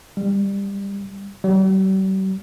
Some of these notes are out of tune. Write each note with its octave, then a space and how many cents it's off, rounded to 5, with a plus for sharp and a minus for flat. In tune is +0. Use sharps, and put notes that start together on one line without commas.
G3 +20
G3 -45